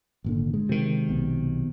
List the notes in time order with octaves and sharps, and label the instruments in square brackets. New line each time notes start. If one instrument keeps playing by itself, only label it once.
[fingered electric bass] G#1 A#2 D3
G#3
[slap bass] C3 D#3
[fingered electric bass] B1 B2